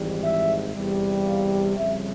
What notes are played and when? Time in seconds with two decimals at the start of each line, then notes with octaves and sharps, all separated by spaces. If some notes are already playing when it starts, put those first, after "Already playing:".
Already playing: G#1 G#2 E3 G3
0.23 E5
0.75 E2 C3 G3
1.26 F5
1.77 F2 C#3 G3 E5